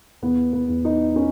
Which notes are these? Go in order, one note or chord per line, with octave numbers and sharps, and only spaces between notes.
E2 B3
B3
E2
D#4
C#4